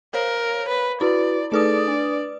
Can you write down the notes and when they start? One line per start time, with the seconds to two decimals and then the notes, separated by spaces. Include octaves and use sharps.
0.14 A#4 C5 C#5 F5
0.69 B4
1.01 E4 F#4 B4 D5
1.52 A3 D#4 G#4 A4 B4 D5 D#6
1.88 D4